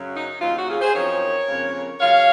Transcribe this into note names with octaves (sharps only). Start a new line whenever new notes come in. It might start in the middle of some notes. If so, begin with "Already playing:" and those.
Already playing: F#2 C#3 F#3 C#4
D#4
D#2 C#3 F#3 A#3 D#4 F4
F#4
F4 G#4
G#4 C5
F#2 F3 C4 D#4 A#4 C#5
F2 C#3 F3 A#3 C#4
D#2 C#3 F#3 C#5 F5